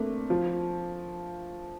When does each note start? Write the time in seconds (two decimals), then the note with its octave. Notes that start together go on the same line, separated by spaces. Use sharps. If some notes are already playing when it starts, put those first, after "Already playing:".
Already playing: A3 A#3 C4 D4
0.30 F3